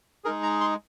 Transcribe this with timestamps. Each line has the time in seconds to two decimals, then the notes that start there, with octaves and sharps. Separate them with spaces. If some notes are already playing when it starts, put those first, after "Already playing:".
0.24 G#3 D#4 G#4 A#4
0.43 A#5
0.61 C6